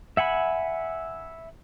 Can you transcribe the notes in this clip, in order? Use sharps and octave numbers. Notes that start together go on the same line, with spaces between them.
E5 F#5 G#5 B5